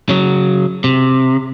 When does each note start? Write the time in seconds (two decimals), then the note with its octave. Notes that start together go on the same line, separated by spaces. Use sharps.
0.09 C#3 F#3
0.84 C3